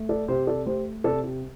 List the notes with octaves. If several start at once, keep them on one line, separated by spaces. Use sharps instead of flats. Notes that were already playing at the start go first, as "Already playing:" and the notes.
Already playing: A3
A4 D5
C3 G4 C5
A4 D5
A3 G4 C5
C3 A4 D5
G4